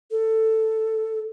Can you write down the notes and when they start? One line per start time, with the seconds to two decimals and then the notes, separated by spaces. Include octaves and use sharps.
0.11 A4